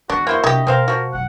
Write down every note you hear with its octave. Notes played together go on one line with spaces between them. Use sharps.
E2 D3 D4 F#4
A#3 E4 F#4 C5
C3 D4 G4 G#4 D#5
B2 C4 A#4 C5 F5
F3 F#4
F#1 B1 F#5